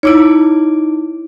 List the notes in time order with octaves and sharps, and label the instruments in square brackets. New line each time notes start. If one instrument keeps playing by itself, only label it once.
[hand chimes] D#4 D6 D7 [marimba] E4 C#5